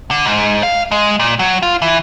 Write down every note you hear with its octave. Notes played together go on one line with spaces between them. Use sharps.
D3
G#2
F5
G#3
A#2
F#3
F4
E3